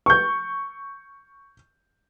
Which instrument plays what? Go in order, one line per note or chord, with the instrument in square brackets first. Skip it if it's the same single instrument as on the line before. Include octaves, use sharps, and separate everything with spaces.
[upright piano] C#6 G6